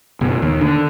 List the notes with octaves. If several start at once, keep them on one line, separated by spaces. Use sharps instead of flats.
F#1 B2
D#2
D3